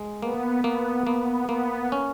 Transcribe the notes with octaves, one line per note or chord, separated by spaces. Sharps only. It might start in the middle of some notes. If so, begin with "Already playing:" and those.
Already playing: G#3
A#3 B3
A#3 B3
A#3 B3
A#3 B3
C#4